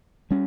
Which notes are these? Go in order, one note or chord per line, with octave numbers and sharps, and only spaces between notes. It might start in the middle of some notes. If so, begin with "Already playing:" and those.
G3 C#4